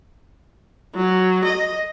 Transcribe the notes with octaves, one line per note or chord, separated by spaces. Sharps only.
F#3
D#5